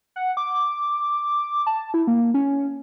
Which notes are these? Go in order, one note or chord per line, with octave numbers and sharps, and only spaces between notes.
F#5
D6
A5
E4
A#3
C#4